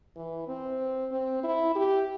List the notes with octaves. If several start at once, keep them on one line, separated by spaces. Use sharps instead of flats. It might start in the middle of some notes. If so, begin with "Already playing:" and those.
E3
C4
C4
E4
G4